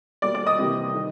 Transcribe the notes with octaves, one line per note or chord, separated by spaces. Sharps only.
B2 G3 A#3 D5 D6
D5 D6
D#5 D#6
C3 E3 G3 A#3
D#3